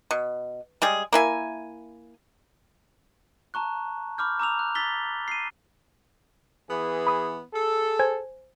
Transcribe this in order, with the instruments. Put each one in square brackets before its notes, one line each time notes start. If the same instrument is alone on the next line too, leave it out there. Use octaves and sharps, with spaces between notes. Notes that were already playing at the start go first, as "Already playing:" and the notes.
[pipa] B2
G3 G#3 G#4
A#3 E4 G#5
[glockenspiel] A5 A#5 C#6 F#6
B5 D6 F6 G6
A#5 D6 E6 F7
F#6
E6 A6 B6 G7
C7 D#7
[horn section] E3 B3 G#4
[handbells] B5 D#6
[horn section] G#4 A4
[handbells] C5 G#5 G#6